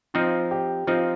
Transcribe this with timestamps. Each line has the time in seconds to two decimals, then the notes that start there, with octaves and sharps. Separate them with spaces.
0.14 F3 C4 D#4 F4
0.51 G4
0.87 F3 C4 D#4 F4